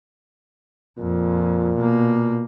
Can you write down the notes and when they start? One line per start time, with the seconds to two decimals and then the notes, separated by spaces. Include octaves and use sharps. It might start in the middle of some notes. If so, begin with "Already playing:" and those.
0.98 F2 A#2
1.76 B2 A#3